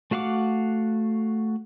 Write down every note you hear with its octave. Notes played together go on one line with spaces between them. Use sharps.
A3 F#4 F5 F#5 D6